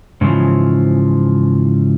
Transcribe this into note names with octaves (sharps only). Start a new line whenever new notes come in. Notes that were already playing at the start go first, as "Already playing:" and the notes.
G#2 C#3 E3 F3